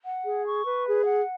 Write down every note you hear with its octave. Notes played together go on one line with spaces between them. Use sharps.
F#5
G#4
C#6
B4
G#4
F#5